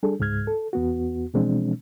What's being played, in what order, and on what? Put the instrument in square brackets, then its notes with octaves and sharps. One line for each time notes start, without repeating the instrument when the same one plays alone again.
[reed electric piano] G3 D4 G#4 A4
C#2 G#2 G#3 F6 G#6
A4
E2 B3 F#4
B2 E3 F3 G#3 C4 D4